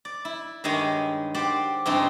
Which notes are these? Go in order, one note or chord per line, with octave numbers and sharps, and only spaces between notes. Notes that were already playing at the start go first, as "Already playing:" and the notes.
D5
E4
G2 D#3 G#3 C#5 G#5
G4 C5 D5 F#5
G2 C#3 E3 C4 C#4 D#4